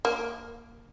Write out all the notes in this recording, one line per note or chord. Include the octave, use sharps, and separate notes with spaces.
A#3